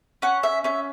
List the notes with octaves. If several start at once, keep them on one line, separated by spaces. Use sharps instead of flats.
C#4 F#5
E5
C#4 E5